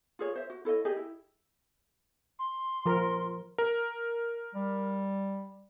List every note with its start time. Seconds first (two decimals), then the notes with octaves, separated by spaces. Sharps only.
0.19 F4 G#4 C#5
0.35 C5 E5
0.50 F#4
0.65 E4 A4 C#5 D#5
0.85 G4 G#4 D#5
0.96 E4
2.39 C6
2.86 F3 A#4
3.58 A#4
4.55 G3